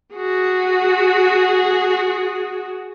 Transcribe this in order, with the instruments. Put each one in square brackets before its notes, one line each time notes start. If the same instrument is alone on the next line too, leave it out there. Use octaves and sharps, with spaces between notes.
[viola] F#4 G#4